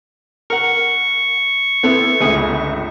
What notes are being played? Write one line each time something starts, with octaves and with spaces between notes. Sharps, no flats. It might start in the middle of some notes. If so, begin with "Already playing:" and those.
A#4 F#5 C#6
B3 C4 E4 A4
G1 C#2 A3 G#4